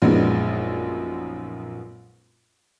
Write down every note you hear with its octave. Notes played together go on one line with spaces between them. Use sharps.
A#1 F#2 G#3 B3 D#4